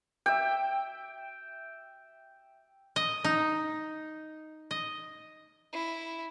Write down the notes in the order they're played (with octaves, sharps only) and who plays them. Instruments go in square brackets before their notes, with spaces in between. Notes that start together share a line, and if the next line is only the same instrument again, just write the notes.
[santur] E5 G5
[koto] D#5
D#4
D#5
[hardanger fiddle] E4